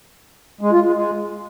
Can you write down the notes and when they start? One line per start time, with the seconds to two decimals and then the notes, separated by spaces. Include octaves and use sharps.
0.61 G#3
0.72 F4
0.83 G#3
0.93 G#3